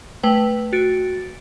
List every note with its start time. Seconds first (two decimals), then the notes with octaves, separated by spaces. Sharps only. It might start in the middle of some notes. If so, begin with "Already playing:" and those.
0.23 A3 B4 G5
0.73 F#4 A6 D7